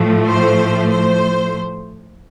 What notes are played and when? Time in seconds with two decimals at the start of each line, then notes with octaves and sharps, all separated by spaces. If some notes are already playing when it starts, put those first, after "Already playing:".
Already playing: A2 F3 A3
0.25 C5
0.90 C5